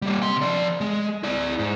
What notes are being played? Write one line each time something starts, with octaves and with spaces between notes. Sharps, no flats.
G3 A#3
C3 C6
F3 D5
G#3
E4 D5
G#2